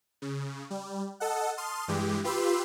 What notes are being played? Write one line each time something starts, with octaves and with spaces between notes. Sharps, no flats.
C#3
G3
A4 D#5 F#5
A5 C6 D#6 F6
G2 E3 G#3 G4
F4 G4 B4 B5 C6 E6